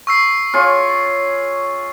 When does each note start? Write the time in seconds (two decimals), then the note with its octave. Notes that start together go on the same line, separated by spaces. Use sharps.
0.07 C#6 E6 C7
0.53 F4 G#4 C#5